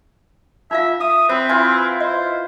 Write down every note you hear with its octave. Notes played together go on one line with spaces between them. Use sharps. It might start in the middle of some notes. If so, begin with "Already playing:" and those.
D#4 F4 E5 F5
E5 D#6
C4 C5 B5
E4 F4 B4 G#5
C5 D#5